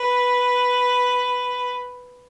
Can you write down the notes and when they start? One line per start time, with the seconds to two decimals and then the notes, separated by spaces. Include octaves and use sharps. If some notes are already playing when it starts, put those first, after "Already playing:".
Already playing: B4